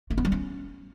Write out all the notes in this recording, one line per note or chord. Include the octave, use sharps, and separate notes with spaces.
A3
B3
G3
C#4